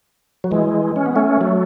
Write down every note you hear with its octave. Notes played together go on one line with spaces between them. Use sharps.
F#3
E3 G#3
C#4
B3
A3 C#4
F#3 A3